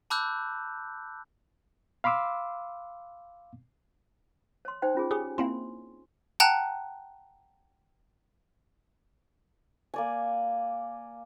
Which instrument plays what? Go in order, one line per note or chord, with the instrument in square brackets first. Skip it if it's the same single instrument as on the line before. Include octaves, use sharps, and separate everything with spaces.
[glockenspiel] A5 B5 D6 E6 F#6 G6
[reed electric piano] F5 B5 C6 D6 E6
[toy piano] C#5 C6
D#4 C5 G5
C#4 F4 G#4
[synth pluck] G4 G#4 [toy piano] C#5 G#5
[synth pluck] A#3 C4 E4 [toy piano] C6
[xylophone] F#5 G5 A5 A#5 F#6
[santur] A#3 D5 G#5